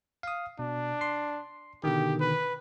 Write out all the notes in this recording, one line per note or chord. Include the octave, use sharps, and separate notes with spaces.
F5 D#6
B2 D4
C6 C7
B2 D3 D#3 G4
B4